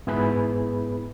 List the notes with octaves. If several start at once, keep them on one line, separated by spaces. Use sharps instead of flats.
G#2 B3 E4 G#4 B4 B5